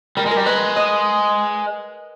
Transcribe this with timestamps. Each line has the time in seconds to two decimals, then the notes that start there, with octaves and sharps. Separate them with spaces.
0.17 G3 A#4
0.26 G#3
0.31 A#4
0.37 G3
0.46 G#3 B4
0.76 D#5